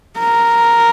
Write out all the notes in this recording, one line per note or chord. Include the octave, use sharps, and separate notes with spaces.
A#4